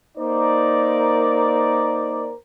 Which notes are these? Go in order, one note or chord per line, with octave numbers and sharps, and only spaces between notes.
A#3 D#4 A#4 C5 D5